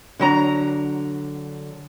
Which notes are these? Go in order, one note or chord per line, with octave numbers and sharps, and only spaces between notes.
D3 F#3 A#5